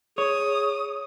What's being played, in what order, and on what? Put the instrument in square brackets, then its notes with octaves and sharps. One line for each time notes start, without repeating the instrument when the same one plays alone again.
[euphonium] G#4 [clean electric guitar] C#5 [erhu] D#6